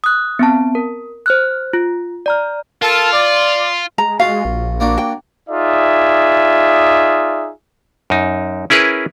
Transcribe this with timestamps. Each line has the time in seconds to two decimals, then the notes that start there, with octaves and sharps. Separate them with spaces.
0.04 D#6 F#6
0.39 B3 C4 A5
0.75 A#4
1.26 C5 F6 F#6
1.73 F4
2.26 D5 A#5 F6
2.82 F4 A4 A#4 A5
3.13 D5
3.98 G#3 A#5
4.20 F4 F#4 F5
4.45 A#1
4.80 A#3 D4 F#4
4.98 G5
5.50 D#4 F4 G#4 D5 E5
8.10 F#2 D#4
8.70 C#4 E4 G#4 A#4 B4